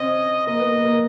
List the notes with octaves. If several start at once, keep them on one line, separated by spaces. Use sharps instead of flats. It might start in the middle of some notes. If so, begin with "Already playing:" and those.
Already playing: C4 C#4 D#5
A#3 D#5
B3
A#3
A#3